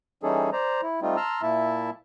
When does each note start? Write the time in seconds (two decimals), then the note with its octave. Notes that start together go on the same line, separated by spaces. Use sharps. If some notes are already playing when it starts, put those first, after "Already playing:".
0.23 E3 G3 C#4 D#4 G#4 A4
0.53 C5 D5 A#5
0.83 E4
1.02 G3 A3 C4 D#4 F4
1.17 A5 A#5 C6 E6 F6
1.42 A#2 A#3 E4 E5 A5